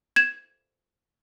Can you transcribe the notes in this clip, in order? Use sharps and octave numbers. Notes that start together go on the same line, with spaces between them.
G#6 E7